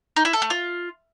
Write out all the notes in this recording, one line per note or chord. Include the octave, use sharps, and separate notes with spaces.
D#4
E4
A4
A3
F4